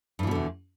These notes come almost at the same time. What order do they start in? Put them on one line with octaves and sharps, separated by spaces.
G2 E3 B2 D3 E2